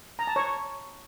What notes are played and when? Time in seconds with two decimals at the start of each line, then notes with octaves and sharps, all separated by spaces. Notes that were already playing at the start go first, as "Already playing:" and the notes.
0.19 A#5
0.27 A5
0.36 C#5